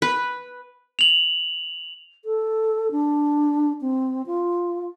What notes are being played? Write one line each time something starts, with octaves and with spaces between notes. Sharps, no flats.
B4
F7 F#7
A4
D4
C4
F4